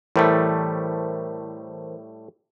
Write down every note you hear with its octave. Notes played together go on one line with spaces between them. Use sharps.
A2 E3 G3 A3 A#4 C5